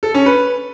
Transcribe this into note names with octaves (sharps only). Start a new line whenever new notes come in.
A4
C#4
B4